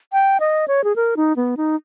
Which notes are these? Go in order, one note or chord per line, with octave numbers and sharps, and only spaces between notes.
G5
D#5
C#5
G#4
A#4
D#4
B3
D#4